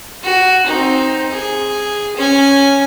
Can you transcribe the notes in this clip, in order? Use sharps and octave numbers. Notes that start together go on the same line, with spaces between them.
F#4
C4 D#4
G#4
C#4 G#5